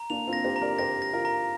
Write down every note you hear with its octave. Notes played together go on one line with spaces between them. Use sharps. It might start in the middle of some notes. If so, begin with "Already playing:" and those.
Already playing: A#5
A#3 D4 F7
C4 F4
A#6
G4 C5
A#5
A#4 D5
G4 C5 A#6
A#6
F4 A#4
A#5